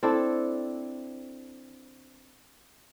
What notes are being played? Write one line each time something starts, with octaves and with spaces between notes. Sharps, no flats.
C4 D4 E4 A4